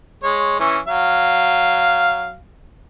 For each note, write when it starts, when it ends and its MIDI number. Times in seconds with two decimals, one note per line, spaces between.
0.23 0.57 56
0.23 0.57 73
0.60 0.78 52
0.60 0.78 61
0.88 2.35 54
0.88 2.35 77